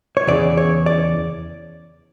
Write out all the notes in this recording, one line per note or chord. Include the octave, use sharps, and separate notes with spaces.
C#5
E2 C#3 E3 D5
C#5
D5